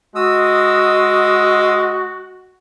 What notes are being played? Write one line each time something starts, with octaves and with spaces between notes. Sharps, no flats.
G#3 F#4 D#6 E6